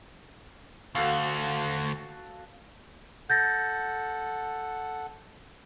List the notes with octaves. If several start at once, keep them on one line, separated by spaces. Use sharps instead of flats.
D2 F#4 A4 F5
A4 F#5 G6 A6 A#6